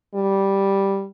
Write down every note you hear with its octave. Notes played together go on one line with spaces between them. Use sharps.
G3